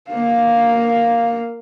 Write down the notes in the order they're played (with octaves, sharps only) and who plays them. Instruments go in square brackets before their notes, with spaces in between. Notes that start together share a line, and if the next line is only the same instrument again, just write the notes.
[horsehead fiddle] A#3 F5